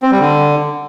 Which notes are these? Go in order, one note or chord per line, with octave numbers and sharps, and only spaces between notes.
C4
G3
D3